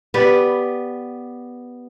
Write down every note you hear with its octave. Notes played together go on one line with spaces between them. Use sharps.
B3 G4 B4 D5